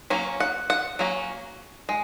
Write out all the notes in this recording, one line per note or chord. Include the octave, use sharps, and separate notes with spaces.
F#3 A#3 C#4
F#5
F#5
F#3 A#3 C#4
G#3